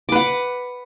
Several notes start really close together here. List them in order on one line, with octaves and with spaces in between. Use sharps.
D6 B4 F#5